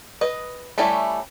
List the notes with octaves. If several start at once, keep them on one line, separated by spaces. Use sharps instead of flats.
B4 D#5
G3 A3 C#4 E4 G4